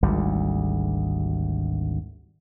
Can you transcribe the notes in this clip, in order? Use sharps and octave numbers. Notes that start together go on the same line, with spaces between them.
G#1 D2 G3